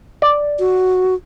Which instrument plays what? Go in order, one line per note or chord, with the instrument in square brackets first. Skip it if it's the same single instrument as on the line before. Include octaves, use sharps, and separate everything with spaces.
[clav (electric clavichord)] D5
[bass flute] F#4